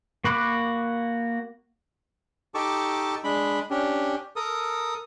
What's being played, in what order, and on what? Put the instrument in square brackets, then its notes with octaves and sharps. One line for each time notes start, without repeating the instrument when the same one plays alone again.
[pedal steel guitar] A#3 F#4 B5 D6 F#6
[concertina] D#4 G4 A4 A5 C#6 D6
G#3 D4 B5
C#4 D4 G4
A4 A#4 D#6